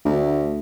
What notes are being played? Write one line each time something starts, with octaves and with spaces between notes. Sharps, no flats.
D2